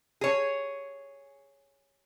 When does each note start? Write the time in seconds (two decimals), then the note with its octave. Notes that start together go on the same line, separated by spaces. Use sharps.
0.21 G#4 C#5